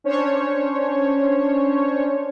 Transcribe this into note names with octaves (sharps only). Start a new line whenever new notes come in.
C#4 D4 C5 C#5